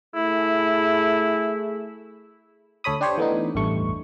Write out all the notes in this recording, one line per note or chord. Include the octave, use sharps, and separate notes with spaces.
A3 E4 G#4
D2 A4 C#5 B5 D#6
D4 G4 C5 C#5
E3 A3 B3 D4 D#4
A1 E2 G2 A3 C#6